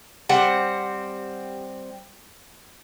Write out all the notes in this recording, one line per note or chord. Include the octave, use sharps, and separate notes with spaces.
G3 C4 F#5